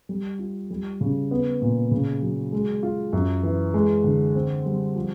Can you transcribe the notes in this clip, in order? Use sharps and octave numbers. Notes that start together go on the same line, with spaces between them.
G3
F4
G3
C#3
B3
A#2
C#3
F#3
G#3
F4
F#2
E3
G#3
D3
C4
G3
F3